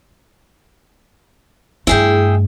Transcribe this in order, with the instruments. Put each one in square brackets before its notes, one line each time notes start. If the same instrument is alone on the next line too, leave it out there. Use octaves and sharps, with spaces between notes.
[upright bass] G2 A3 [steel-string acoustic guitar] E4 G#4 G5